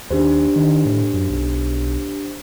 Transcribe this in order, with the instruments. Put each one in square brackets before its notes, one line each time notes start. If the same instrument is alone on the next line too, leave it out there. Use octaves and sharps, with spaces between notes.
[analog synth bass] D#2 [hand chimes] D4 G4 C5
[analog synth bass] D#3
A2
F#2
B1